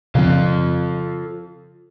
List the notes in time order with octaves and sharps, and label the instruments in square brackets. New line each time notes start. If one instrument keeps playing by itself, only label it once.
[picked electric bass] C#3 F3 C4 [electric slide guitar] F4 A4 F5